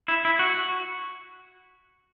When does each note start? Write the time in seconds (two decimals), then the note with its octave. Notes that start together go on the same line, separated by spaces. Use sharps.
0.08 E4
0.25 E4
0.39 F#4